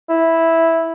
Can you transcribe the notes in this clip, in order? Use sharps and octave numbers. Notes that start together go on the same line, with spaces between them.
E4